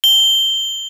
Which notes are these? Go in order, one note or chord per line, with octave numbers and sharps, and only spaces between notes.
G7